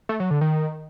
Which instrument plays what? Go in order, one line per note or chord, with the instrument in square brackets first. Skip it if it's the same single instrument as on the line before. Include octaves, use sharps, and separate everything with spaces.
[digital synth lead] A3
F#3
D3
D#3